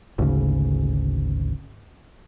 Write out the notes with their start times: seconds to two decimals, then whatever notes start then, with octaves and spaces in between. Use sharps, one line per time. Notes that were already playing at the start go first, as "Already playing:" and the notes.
0.18 G#1 D2 C#3